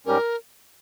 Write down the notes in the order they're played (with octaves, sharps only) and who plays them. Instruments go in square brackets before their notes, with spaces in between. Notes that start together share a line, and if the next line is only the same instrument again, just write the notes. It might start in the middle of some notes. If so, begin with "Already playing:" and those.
[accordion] G#2 G3 C#4 G4 [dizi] A#4